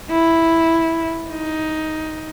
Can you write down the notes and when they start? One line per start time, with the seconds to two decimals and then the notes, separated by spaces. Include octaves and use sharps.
0.11 E4
1.31 D#4